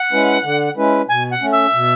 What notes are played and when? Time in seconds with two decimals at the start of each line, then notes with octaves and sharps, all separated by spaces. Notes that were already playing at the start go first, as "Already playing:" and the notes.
Already playing: F#5
0.12 G#3 C#4 E4 B4
0.44 D3
0.77 G#3 C#4 E4 B4
1.08 B2 G#5
1.31 F#5
1.41 A3 C#4
1.52 E5
1.74 B2